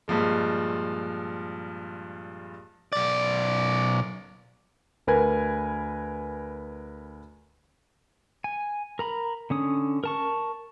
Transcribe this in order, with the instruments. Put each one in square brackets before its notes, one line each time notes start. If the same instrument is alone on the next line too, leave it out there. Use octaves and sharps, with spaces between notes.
[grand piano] G2 A#2 F3 G#3
[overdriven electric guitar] B1 D5
[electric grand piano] D2 A#4 B4 G#5 G#6
[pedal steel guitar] G#5
A#4 A#5 B5
D3 C#4 D#6
A#4 A5 C#6